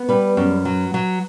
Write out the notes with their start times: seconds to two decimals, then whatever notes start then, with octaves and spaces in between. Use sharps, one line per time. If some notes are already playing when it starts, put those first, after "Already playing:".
Already playing: B3
0.09 G3 B4
0.37 F#2
0.65 F#3
0.94 F#3